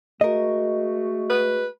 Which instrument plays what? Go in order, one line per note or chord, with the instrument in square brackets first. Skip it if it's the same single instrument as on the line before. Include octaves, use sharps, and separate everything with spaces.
[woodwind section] G#3 A3 F#4 [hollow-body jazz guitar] A#4 D#5
[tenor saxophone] B4